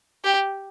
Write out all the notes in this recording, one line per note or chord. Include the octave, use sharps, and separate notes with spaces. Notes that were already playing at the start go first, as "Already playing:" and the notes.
G4